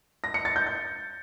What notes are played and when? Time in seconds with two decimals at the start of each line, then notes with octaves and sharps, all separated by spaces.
0.24 A#6
0.34 C#7
0.45 A6
0.56 G6
0.67 G6